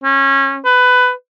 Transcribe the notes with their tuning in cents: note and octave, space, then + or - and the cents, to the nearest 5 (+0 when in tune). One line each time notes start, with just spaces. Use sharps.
C#4 -25
B4 +15